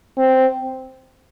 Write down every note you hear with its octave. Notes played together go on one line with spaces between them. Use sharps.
C4